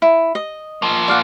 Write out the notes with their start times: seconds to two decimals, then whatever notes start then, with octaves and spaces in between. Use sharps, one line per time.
0.02 E4
0.35 D#5
0.82 F3 A#3
1.08 D5 F5 F#5